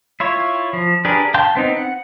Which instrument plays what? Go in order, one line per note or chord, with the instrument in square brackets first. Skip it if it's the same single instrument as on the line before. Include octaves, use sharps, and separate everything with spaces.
[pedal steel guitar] E4 F4 C#5
F3
D4 G4 G#4 A#4 B4
F5 G5 A5 C6 G6
B3 C4 D#4
F#5